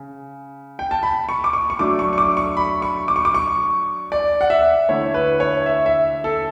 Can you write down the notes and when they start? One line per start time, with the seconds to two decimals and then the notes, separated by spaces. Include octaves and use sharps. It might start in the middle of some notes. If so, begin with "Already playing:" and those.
Already playing: C#3
0.79 G5
0.91 A5
1.03 B5
1.29 C#6
1.44 D6
1.53 C#6
1.70 C#6
1.79 F#3 A3 D4 D6
1.99 C#6
2.13 C#6
2.18 D6
2.37 C#6
2.57 B5
2.82 C#6
3.08 D6
3.16 C#6
3.25 D6
3.34 C#6
4.12 D5
4.41 F#5
4.50 E5
4.89 D3 A3 E4 C#5
5.14 B4
5.40 C#5
5.66 E5
5.86 E5
6.24 A4